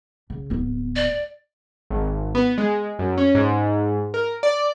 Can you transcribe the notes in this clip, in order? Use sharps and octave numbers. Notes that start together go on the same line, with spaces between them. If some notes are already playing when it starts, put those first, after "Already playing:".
C#3
D1 B3
D5
G#1
B3
G#3
F#2
C#4
G#2
A#4
D5